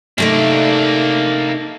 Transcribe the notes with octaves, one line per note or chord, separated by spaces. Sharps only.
C3 A3 A#3 D4 D#4